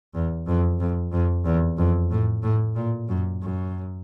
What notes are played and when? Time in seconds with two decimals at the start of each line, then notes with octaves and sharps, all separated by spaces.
0.14 E2
0.47 F2
0.80 F2
1.13 F2
1.45 E2
1.78 F2
2.11 A2
2.43 A2
2.76 A#2
3.09 F#2
3.42 F#2